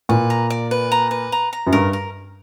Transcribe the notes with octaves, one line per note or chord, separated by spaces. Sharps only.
A#2 B4
A#5
D5
B4
A#5
B4
A#5
A#5
F#2
G2 A#4
A#4